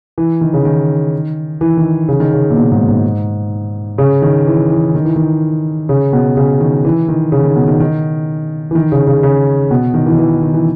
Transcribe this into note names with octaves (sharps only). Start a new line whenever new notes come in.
E3
D#3
C#3
D#3
E3
D#3
C#3
D#3
C#3
A#2
B2
G#2
G#2
C#3
D#3
E3
E3
D#3
E3
D#3
C#3
B2
C#3
D#3
E3
D#3
C#3
D#3
B2
D#3
D#3
E3
D#3
C#3
C#3
C#3
B2
D#3
E3
D#3
E3
D#3
E3